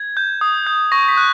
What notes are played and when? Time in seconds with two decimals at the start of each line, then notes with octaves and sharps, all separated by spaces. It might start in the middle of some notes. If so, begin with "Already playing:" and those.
Already playing: G#6
0.17 G6
0.41 D#6
0.66 G6
0.92 C#6 A#6
1.08 B6
1.17 F#6